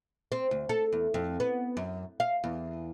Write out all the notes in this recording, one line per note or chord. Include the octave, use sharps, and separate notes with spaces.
C4
D2
A4
E2
F2
B3
F#2
F5
E2